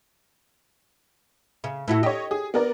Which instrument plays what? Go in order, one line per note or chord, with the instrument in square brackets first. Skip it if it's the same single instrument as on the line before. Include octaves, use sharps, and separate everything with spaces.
[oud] C#3
A2 E4 F#4
[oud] G4 [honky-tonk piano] C#5 D#5
[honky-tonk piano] G#4
B3 A#4 D5